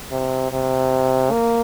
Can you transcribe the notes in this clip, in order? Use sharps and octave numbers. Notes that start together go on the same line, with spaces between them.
C3
C3
A#3